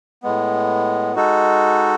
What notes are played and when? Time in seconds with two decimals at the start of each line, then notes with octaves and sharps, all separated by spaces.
0.23 A2 G#3 B3
1.16 G#3 D#4 F#4 A4